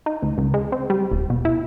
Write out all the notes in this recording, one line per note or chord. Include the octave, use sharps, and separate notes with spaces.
D#4
D2
C#2
G#3
C4
G3
D#1
B2
E4